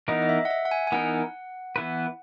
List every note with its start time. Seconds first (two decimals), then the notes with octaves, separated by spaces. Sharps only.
0.08 E3 B3 D#4 A#4 D#5
0.22 D#5
0.29 E5
0.45 F#5
0.50 E5
0.65 F#5
0.71 G#5
0.87 G#5
0.92 E3 B3 D#4 A#4 F#5
1.76 E3 B3 E4 B4